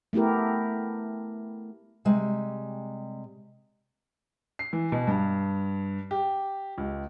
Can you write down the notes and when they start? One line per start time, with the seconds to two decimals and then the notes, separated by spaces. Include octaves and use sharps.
0.13 A3 B3 E4 G4 A#4
2.05 C3 G3 G#3 G4 G#5
4.59 C7
4.73 E3
4.92 B2
5.07 G2
6.11 G4
6.78 C#2